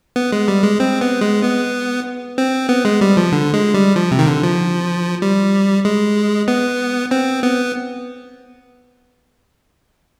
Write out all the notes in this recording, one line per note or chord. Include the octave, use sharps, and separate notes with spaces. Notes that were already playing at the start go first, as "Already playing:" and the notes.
B3
G#3
G3
G#3
C4
B3
G#3
B3
C4
B3
G#3
G3
F3
D3
G#3
G3
F3
C3
D#3
D3
F3
G3
G#3
B3
C4
B3